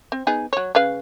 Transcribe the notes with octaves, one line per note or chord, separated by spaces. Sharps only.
C4
B3 D#4 G#4
F#3 C#5
C#3 B4 F5